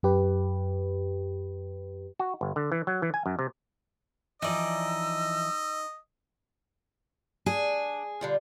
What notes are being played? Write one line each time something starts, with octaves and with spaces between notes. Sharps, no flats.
F#2 G4 B4
F#4
G1
D3
E3
F#3
E3
G#5
F#2
C3
E3 F3 D#4 D5 D#5 E6
D4 G#4
D3 G3 F4